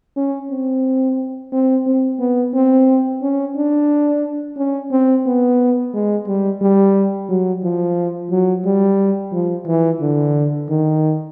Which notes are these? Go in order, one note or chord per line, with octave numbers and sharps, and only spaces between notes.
C#4
C4
C4
C4
B3
C4
C#4
D4
C#4
C4
B3
G#3
G3
G3
F#3
F3
F#3
G3
F3
E3
D3
D#3